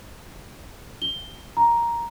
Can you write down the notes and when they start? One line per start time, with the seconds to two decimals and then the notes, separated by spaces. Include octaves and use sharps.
1.02 G7
1.57 A#5